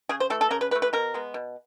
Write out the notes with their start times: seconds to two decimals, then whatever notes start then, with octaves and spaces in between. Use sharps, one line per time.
0.09 C#3 G#4
0.20 C5
0.30 E3 A3 A4
0.41 A4
0.51 C#3 A#4
0.61 B4
0.71 E3 A3 B4
0.82 B4
0.93 B2 A#4
1.14 G#3 B3
1.34 B2